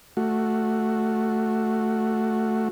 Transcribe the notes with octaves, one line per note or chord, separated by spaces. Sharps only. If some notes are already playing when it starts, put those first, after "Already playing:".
A3 F#4